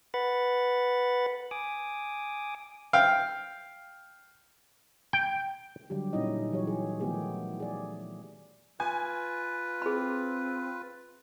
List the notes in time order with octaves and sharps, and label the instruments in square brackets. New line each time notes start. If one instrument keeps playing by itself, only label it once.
[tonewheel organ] B4 F#5 B5 A6
G#5 D6 D#6
[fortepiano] F5 G5
[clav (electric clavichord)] G5
[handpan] D3 F#3 G3 G4
A#2 C#4 D#4 E4 D#5
E3 F#3 G4 C#5
G#4
D#3 F3 A3 B3 G4 G#4
G#4 D5
[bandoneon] F4 B4 [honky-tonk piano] G#5
[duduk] C4 [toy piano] G#4 B5